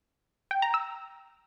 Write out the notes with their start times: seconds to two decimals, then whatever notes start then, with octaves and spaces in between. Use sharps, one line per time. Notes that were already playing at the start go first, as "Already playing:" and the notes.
0.51 G5
0.62 A#5
0.74 E6